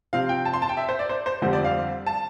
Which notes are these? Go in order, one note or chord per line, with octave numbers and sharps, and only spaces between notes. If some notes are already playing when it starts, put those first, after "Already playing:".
C3 F3 C4 F5
G5
A5
C6
A5
G5
E5
C5
D5
C5
C5
F2 D3 G3 C4 C5
D5
F5
A5